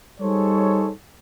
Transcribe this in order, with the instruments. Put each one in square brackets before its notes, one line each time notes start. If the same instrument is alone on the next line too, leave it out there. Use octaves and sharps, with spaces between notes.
[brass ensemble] G3 D#4 G#4 A4 C5 C#5